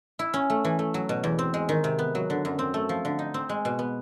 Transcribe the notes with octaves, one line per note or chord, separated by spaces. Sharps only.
E4
C#4
A3
E3
A3
F#3
B2
E2
C4
G#3
D#3
C3
B3
F#3
D3
F#2
C4
A3
F3
D3
D#4
C4
G#3
B2
B3